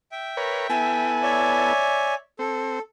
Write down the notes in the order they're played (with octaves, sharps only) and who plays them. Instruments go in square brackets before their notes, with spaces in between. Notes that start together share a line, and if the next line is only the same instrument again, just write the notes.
[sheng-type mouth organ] E5 G5
[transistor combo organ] A#4 B4 C#5
[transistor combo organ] B3 E4 A4 [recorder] G#5
[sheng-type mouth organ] C#5 D5 E5
[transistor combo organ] C4 [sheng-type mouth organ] A4